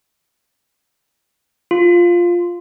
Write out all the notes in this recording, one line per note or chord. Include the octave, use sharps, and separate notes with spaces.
F4